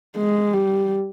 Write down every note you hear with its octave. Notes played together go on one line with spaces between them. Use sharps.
G#3
G3